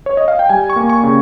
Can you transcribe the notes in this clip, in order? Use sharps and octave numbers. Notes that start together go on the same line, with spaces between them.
C#5
D#5
F5
G5
G3 G#5
C#6
A#3
C#6
C#3